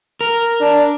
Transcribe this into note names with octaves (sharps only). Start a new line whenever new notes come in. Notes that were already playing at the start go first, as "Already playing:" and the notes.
A#4
D4